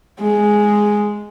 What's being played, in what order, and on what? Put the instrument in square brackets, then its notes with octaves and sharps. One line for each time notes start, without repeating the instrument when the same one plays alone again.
[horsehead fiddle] G#3